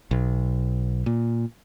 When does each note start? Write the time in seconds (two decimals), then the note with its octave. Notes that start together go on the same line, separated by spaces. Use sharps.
0.11 B1
1.06 A#2